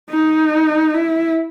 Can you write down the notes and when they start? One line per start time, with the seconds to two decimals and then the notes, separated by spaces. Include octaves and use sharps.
0.10 D#4
0.94 E4